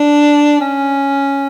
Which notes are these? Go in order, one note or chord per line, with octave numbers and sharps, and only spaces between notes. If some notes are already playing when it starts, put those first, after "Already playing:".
Already playing: D4
C#4